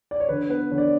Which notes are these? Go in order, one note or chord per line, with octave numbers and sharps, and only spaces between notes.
D5
C#5
D3 B4
B3 B4
D3 C#5
D5